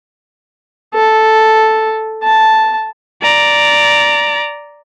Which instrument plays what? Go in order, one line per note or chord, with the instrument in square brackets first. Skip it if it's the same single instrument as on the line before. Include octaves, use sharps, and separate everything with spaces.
[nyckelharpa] A4
A5
[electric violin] D5 A#5